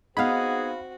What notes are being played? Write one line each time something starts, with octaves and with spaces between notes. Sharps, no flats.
B3 C4 D#4 F#4 G#4 F5 F#5 B5